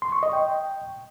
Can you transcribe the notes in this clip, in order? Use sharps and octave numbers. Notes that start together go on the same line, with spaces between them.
C6
C#6
D#5
G5